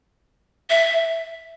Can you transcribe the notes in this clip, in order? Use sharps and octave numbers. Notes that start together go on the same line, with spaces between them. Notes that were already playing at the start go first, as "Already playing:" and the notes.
E5